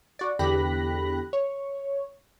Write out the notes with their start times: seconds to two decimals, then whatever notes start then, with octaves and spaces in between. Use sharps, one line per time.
0.19 F#4 D5
0.39 E2 D3 G4 B5 F#6 A#6
1.33 C#5